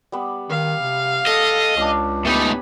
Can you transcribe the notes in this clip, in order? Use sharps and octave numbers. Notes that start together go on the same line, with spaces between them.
G3 B3
D#3 F5
C3
A4 D#5
C#2 C#4 D4
A2 B3 D#4 G4 G#5 B5